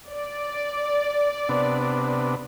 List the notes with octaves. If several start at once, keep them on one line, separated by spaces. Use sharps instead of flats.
D5
C3 B3 D4